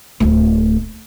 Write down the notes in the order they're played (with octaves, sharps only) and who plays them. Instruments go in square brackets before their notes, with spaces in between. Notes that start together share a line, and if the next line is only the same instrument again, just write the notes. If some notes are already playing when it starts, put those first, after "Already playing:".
[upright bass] D1 A3